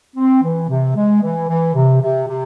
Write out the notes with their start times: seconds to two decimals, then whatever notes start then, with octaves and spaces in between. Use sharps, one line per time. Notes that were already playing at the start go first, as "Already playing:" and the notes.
0.16 C4
0.43 E3
0.69 C3
0.95 G#3
1.22 E3
1.48 E3
1.75 C3
2.01 C3
2.28 C3